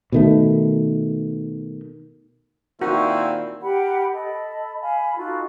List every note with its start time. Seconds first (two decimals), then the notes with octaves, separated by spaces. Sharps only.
0.12 B2 D#3 A3
2.81 A#2 D#3 C4 E4 F#4
3.62 G4 A#4 F#5 B5
4.12 A4 D#5 B5
4.80 F5 G#5 B5
5.16 D#4 F4 F#4 A4